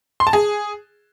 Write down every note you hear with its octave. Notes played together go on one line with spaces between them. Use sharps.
C6
A5
G#4